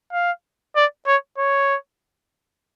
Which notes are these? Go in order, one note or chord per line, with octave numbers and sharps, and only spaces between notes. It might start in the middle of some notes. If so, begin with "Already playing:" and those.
F5
D5
C#5
C#5